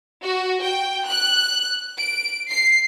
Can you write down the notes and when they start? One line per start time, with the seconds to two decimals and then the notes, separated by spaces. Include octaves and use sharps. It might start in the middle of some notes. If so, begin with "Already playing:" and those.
0.23 F#4
0.62 G5
1.08 F#6
1.97 D7
2.50 C7